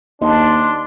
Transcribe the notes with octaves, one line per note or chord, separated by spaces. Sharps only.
D#2 D4 D#5 A5 C6